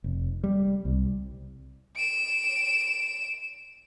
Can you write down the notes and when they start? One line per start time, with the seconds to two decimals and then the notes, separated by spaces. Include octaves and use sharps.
0.04 F1
0.44 G3
0.85 C2
1.95 D7 E7